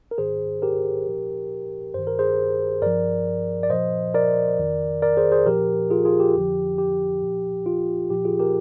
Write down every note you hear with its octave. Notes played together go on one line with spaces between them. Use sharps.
A#4
G#2 D#3 G#4 C5
G4 A#4
A#2 F3
G2 D#3 C5
A#4
G#4 C5
G2 F3 A#4 D5
D5
A#2 F3 C5 D#5
A#4 D5
F2 D#3
A#4 D5
G#4 C5
G#4 C5
A#2 F3 G4 A#4
F4 G#4
F4 G#4
G4
F2 D3 F3
G4
A#2 F3
F4
A#2 F3 G4
F4 G#4
G4 A#4